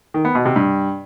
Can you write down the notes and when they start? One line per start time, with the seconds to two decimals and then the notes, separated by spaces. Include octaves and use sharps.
0.14 D#3
0.25 B3
0.35 B2
0.45 C3
0.56 G2